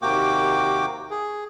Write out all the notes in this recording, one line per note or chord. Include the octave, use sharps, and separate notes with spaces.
D#2 C3 A#3 F#4 G5 D6
G#4